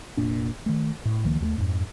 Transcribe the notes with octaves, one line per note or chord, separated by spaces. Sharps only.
F1 A#2 D4
D#3 A3
A2
C#2 D#3 F3 A#3
D#2 F#3 A3
F2 G#2